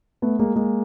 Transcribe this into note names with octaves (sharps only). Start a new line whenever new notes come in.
A3 B3
G#3 A#3
G#3 A#3